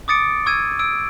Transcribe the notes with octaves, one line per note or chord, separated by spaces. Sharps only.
D6 D#6 A6 C#7 D7
C#6 E6 G#6 D#7
E6 D7